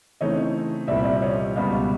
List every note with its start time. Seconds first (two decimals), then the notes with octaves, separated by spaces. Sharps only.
0.21 C#3 E3 A3 C4 D#4 C#5 D#5
0.88 C2 A#2 G3 C4 D5 E5
1.05 D5 E5
1.22 C#5 D#5
1.56 C#2 B2 G3 B3 D#5 F5